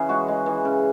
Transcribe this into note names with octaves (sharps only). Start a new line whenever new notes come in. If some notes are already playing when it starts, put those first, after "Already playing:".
Already playing: C#3 E3 G#4 B4
G#3 F#4
G#3
E3
C#3